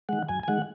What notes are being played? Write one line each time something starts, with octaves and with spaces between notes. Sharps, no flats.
D#3 G#3 F#5
F#2 G#5
G#5
D#3 G#3 F#5